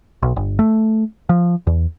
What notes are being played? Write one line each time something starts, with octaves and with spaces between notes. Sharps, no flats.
B1
G1
A3
F3
E2